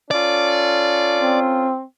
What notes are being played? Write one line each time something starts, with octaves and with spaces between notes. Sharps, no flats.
C#4 F4 A4 D5
C4